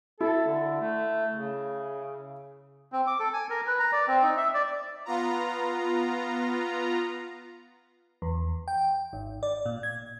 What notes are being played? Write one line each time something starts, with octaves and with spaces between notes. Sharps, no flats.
E4 A4
D3
A3
C#3
C4
D6
A4
G#5
A#4
B4
A#5
D5
C4
D#4
E5
D5
B3 F4 A#5
E2
G5
G#1
D5
A#2
G#6